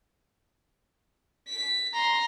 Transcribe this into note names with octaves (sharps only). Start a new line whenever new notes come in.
B6
A#5 C6